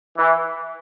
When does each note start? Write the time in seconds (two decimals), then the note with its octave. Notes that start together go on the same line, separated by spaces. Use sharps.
0.17 E3